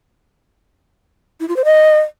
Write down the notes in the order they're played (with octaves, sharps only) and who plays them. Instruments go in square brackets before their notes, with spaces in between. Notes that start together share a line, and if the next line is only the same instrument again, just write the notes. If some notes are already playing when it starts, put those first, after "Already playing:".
[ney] E4
F4
C5
D#5